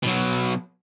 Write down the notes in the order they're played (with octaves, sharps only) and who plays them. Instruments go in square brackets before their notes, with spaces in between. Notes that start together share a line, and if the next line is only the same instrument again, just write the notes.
[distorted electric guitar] B2 F#3